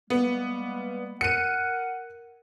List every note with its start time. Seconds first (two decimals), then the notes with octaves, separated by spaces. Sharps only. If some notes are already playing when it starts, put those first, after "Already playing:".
0.10 G3 G#3 A#3 B3
1.21 A#4 F#5 C#7 D#7